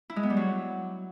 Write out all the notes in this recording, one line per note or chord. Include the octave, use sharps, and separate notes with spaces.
E4
G#3
B3
G3
F#3